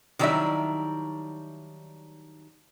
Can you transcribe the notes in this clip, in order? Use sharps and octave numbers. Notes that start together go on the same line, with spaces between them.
D#3 F#3 G3 D4 E4 E5